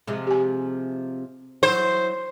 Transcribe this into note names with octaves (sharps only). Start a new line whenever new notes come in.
C3 F3 G#3
G4 G#5
E3 F#3 C5